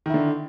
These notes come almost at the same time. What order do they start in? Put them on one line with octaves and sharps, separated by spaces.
D#3 E4 D3